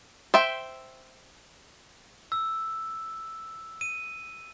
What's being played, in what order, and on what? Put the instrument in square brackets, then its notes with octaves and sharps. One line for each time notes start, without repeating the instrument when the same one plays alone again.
[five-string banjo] C5 E5 G5
[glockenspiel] E6
D#7